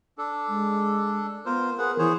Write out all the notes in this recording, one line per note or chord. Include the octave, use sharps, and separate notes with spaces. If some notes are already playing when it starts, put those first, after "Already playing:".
D4 A4
G#3
B3 F4 A#4 C5
G#4 A#4 B4 F#5
E3 G#4 C5 C#5